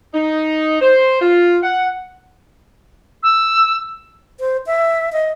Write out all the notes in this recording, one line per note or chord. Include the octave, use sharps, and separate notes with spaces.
D#4
C5
F4
F#5
E6
C5
E5
D#5